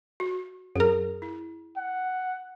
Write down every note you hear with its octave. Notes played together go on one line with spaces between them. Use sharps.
F#4
F#2 G#4 A#4
E4
F#5